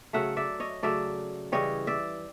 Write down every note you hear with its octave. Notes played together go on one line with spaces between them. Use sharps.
C#3 F#3 A3 E5 F#5
D5 E5
C#5 D#5
C#3 F#3 A3 D5 E5
C#3 E3 G3 C#5 D#5
D5 E5